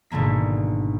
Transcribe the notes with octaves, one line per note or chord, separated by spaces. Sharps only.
G#1 B2 D3 A#3 B6